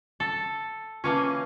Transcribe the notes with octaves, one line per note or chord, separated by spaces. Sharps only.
A4
E3 A#3 C#4 F4 B4 A5